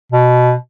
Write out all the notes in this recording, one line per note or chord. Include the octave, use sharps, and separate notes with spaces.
B2